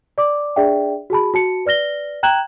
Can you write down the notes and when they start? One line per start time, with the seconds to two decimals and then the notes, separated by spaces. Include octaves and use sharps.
0.18 D5 D6
0.56 D4 G#4 D5 E5 G5
1.10 F#4 G#4 A5 B5
1.34 F#4 A5 C#7
1.65 B4 D5 F6 A#6 G7
2.23 G5 A#5 F#6 G#6 E7 F#7